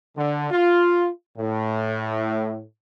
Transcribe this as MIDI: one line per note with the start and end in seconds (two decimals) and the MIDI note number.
0.18 0.49 50
0.51 1.08 65
1.38 2.63 45